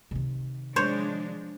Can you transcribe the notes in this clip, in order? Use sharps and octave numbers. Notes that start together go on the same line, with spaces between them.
C3 D#3
F3 G#3 D4 C5 C#5